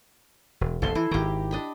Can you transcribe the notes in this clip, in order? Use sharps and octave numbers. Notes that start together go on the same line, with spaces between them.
E1
F1 A#1 F3 A4 C6
E3 E4
G#1 D#3 G4 A#5
D4 D#5 B5